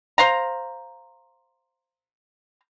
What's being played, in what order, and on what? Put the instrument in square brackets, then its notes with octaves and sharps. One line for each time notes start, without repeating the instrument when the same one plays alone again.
[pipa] C5 F5 A#5